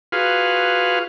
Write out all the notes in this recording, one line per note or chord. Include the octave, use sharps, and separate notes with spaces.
F4 F#4 G#4 B4 F5